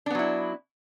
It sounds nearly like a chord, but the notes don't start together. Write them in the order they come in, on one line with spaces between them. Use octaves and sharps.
D4 B3 F#3 E4